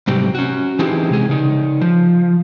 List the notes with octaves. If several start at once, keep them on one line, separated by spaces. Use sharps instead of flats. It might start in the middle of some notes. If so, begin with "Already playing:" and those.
G#2 C3 F#3 G3
C#4 F#4
E3 C4 D#4 E4 G4 G#4
C3 G#3 G#4
C#3 D#4
F3